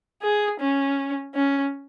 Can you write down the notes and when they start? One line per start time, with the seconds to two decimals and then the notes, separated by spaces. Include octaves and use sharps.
0.22 G#4
0.60 C#4
1.35 C#4